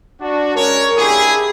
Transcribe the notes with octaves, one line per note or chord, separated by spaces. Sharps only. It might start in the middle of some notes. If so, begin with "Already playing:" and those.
D4 F#4
G#3 C#4 A#4 C#5
D3 A#3 E4 G4 G#4